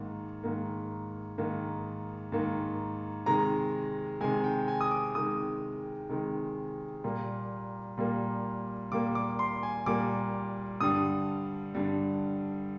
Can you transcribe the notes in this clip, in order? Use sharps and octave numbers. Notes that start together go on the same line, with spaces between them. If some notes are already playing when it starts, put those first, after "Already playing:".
Already playing: G#2 D#3 A#3
G#2 D#3 A#3
G#2 D#3 A#3
G#2 D#3 A#3
C3 D#3 G#3 A#5
C3 D#3 G#3 G#5
G5
G#5
D#6
D6
C3 D#3 G#3 D#6
C3 D#3 G#3
A#2 G3 A#3
A#2 G3 A#3
A#2 G3 A#3 D6
D6
C6
G#5
A#2 G3 A#3 D6
G2 D3 G3 D#6
G2 D3 G3